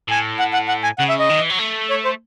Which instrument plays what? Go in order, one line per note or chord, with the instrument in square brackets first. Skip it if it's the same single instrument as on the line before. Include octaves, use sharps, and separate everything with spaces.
[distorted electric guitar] A2 [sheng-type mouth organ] G#5
[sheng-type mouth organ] F#5
F#5
F#5
G#5
[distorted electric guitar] C#3 [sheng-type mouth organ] F#5
[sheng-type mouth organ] E5
D#5
[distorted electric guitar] D#3
E3
F#3
A3
[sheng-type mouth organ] C#5
C5